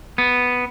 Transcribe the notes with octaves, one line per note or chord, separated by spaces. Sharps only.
B3